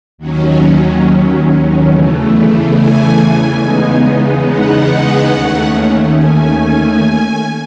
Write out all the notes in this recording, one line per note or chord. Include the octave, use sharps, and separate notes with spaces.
D#2 D#3 F#3 C#4
E2 C#3 E3 A3
G#5
E2 C#3 G#3 B3 D#4
F#5
D#2 D#3 A3 C#4
G#5